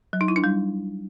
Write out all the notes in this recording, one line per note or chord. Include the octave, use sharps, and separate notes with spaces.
F#3
D#4
E4
D4
G3